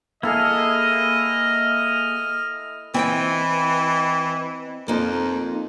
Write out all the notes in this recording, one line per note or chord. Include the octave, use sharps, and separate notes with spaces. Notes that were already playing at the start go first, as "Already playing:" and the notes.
A#3 E4 G#4 A4 D#5 F6
E3 C4 D#5 G5
F2 A#3 D#4